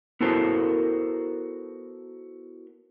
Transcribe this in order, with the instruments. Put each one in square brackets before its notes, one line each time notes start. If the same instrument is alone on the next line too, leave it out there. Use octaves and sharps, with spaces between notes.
[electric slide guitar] B3 E4 F#4 A4 A#4 C5